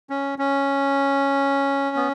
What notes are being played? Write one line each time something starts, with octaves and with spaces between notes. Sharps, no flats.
C#4
C#4
B3